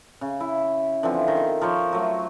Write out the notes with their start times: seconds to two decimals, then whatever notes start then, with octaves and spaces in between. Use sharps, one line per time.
0.21 C#3
0.40 E4
1.03 D3 E3 F3 C4
1.28 D#3
1.61 F3 A#4 C5 C#5
1.93 F#3 A3